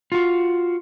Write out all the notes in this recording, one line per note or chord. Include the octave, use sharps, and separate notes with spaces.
F4 F#4